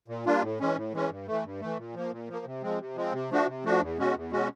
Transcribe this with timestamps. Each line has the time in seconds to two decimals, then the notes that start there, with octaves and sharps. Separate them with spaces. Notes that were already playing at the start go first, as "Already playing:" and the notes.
0.08 A#2
0.26 G3 A#3 D4 F4
0.42 A2
0.60 E3 G#3 C#4
0.76 A2
0.93 E3 G#3 C#4
1.10 G2
1.27 E3 A3
1.44 G2
1.61 E3 A3
1.78 A#2
1.94 F3 A#3
2.12 A#2
2.29 F3 A#3
2.45 C3
2.62 F3 G#3 C4
2.80 C3
2.96 F3 G#3 C4
3.13 C3
3.30 F3 A3 D4 F#4
3.47 C3
3.64 F3 A3 D4 F#4
3.81 E2
3.98 B2 G#3 C#4 F#4
4.15 E2
4.32 B2 G#3 C#4 F#4